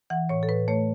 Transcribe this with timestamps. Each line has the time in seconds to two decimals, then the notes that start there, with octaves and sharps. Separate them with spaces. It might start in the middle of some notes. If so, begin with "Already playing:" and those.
0.10 E3 F#5
0.29 A2 C#5
0.43 A4
0.48 A2 B4
0.68 A3 C#5